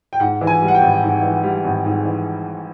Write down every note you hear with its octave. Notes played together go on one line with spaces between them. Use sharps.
G5
G#2 F#5
E3
G#5
G3
F#5
G5
G#1
G#2
E3
G3
G#1
G#2
E3